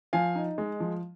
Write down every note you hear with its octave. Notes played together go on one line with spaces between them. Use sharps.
F3 F5 G#5
D#4
G#3
F3